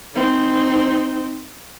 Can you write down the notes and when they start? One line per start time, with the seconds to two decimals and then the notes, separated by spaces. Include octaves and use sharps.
0.14 C4 D#4